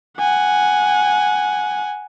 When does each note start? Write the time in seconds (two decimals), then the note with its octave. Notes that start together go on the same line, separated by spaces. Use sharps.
0.18 F#5 G#5